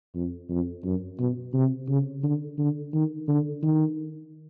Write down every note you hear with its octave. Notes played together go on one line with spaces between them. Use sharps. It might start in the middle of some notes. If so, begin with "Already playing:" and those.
F2
F2
F#2
B2
C3
C#3
D3
D3
D#3
D3
D#3